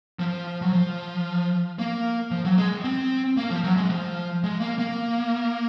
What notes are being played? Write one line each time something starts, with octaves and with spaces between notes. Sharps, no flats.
F3
F#3
F3
A#3
F3
F#3
G#3
C4
A#3
F3
F#3
G#3
F3
G#3
A#3
A#3